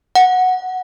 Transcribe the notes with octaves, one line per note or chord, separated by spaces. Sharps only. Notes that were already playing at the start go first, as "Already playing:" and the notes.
F#5